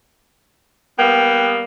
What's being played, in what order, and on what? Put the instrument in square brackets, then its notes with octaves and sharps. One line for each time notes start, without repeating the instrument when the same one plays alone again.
[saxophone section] G3 A#3 B3 [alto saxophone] G5